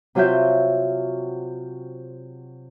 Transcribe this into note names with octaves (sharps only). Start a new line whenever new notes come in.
C3 F#3 F4 F#4 E5 G6